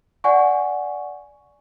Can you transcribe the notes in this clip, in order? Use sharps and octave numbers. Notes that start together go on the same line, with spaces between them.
D5 F#5 G#5 C#6